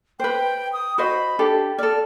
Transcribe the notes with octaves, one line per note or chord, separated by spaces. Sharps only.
B4 C5 G5
D#6
F#4 C5 D#5 B5
D4 G4 A4
A4 D5 F6